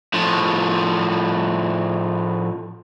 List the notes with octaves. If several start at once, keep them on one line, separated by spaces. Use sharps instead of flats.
A2 F3